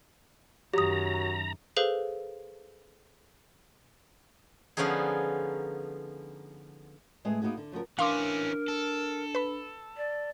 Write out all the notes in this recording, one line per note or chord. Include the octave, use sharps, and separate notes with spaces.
F#2 D#3 F#3 G4 A#5 D#6
G#4 A4 B4 C5 F5
D3 F3 B3 C#4 D#4 G#4
A2 G#3 C4 G#4 B4 E5
A#3 B3 D#4 F#4 G#4
D3
C#3 F3 F#4 A#4
E3 C#4 D4 A#4 F5 C6 D6
A4
B4 B5
D5